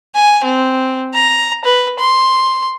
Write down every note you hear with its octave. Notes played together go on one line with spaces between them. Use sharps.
G#5
C4
A#5
B4
C6